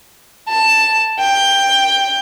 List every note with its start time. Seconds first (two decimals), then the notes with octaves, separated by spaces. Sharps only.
0.49 A5
1.19 G5